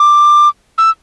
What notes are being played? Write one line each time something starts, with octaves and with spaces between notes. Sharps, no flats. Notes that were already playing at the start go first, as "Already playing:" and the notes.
Already playing: D6
E6